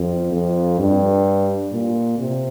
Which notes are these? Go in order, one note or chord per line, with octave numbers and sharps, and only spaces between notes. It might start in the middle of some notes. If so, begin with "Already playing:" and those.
Already playing: F2
F2
G2
A#2
C3